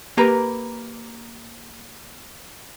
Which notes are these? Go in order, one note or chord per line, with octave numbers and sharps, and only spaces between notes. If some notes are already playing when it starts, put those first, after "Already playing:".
A#3 G4 A#4 B4 A#5